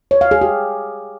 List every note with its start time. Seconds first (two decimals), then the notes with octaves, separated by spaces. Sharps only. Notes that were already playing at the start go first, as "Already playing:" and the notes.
0.11 C#5
0.21 F5
0.31 G#4
0.41 G4